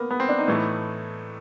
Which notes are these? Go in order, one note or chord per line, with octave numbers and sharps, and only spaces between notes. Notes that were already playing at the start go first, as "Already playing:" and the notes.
Already playing: A#3 B3
B3
C4
D4
D#4
A2 E3 A3